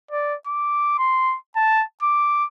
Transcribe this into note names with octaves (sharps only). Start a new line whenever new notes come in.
D5
D6
C6
A5
D6